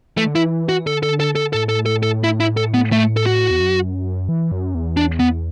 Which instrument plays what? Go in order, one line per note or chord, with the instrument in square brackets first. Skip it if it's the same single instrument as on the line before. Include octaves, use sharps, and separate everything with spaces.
[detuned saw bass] E3 [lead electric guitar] A3
[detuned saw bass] D3
[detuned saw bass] E3 [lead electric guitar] E4
[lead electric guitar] F#4
[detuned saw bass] D3 [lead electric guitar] A4
[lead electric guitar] A4
A4
A4
[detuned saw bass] A2 [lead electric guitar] A4
[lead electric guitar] A4
A4
A4
E4
E4
A4
B3
A3
A4
F#4
[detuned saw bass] E2
F#2
E3
F#2
E2
[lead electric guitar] D4
B3